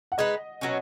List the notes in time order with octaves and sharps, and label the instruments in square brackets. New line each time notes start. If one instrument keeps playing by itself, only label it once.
[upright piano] F#5
[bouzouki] G#3 D#4 B4 [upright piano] D#5
[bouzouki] B2 F#3 C#4